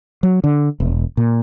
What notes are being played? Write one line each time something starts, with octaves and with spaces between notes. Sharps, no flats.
F#3
D3
E1
A#2